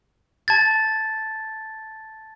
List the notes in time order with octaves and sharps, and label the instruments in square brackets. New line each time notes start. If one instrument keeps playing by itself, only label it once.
[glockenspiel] A5 G#6 A6